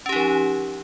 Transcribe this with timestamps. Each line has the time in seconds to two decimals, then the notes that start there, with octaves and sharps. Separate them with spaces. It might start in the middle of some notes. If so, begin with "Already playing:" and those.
0.06 C#4
0.09 G4
0.12 D#4
0.16 F3